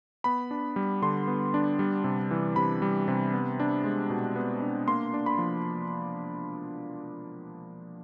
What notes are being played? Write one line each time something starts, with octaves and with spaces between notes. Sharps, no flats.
B3 B5
D4
G3
D3 C6
B3
D4
G3
C3
E3
C3 B5
G3
C3
B3
D4
G#3
B2
B3
D4
A#3 C6
D4
B5
F3